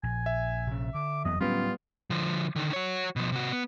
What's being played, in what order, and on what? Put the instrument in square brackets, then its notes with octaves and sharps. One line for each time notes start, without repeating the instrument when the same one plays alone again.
[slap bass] A#1 [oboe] G#5
[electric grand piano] E5
[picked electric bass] C3 C#4
[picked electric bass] D3 [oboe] D6
[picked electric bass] F#1 F#3 [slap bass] F2 E3 B3 [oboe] D#5
[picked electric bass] A2 F#3 [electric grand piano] G3 B3 [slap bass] C#4 [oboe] F4
[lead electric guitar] D3 F3
D3 D#3
F#4 C#5
B2 F3
C3 F#4
B3